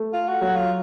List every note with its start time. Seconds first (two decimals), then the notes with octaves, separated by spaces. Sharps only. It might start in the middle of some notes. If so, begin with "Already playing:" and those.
Already playing: A3
0.13 F4
0.28 F#4
0.41 F#3 F#4
0.56 F4